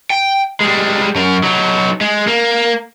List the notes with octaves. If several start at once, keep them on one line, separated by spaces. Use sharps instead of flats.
G5
G3 G#3
F#2 A#4
F#3 D#4
G#3
A#3